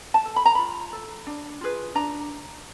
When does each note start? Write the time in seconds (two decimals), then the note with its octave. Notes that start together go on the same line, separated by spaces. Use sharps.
0.14 A5
0.25 A4
0.36 B5
0.46 A#5
0.55 F4 B5
0.93 A4
1.27 D4
1.61 F4 G#4 B4
1.95 D4 A#5